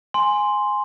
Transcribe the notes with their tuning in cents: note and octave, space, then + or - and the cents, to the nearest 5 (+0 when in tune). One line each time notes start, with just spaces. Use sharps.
G#5 +0 C6 +0